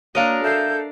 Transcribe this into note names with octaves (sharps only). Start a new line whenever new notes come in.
A#3 D4 F#4 A#4 C#5 D#5 F5
A4 E5 F5 G6 C7